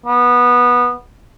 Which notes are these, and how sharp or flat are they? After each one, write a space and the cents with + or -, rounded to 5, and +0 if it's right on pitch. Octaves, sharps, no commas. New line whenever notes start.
B3 -15